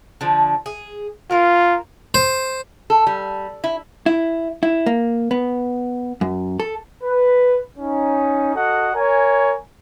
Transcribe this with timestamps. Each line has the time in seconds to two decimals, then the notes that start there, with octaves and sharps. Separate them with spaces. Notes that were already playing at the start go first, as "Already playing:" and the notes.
0.21 D3 F3
0.66 G#4
1.31 A#3 F4 A#4
2.14 C5
2.90 A4
3.07 G3
3.64 E4
4.06 E4
4.63 E4
4.86 A#3
5.31 B3
6.21 F#2
6.60 A4
7.04 B4
7.79 C#4 D#4
8.55 F#4 A4 D#5 F#5
8.95 A#4 C#5 G#5